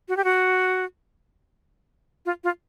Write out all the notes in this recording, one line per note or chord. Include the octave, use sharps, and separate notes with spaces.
F#4
G4
F#4
F4
F4